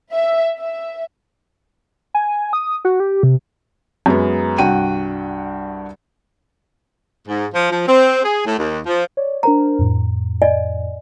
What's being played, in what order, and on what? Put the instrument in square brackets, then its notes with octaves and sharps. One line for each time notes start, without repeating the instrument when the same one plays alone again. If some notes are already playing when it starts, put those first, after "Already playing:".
[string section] E5
E5
[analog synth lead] G#5
D#6
F#4
G4
C3
[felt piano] F#2 G#3 B3
C2 G2 F#4 F#5 G5 D#7
[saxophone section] G#2
F3
F3
C4
G#4
A2
D#2
F3
[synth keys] C#5 D5
[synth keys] D4 A#4 C5 [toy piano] A#5
[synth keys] F2 A2
[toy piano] D5 D#5 G#5